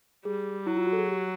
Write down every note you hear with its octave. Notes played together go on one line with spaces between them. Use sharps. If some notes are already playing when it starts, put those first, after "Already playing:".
G3 G#4
F#3 E4
F4
F#4
A4
G#4
G4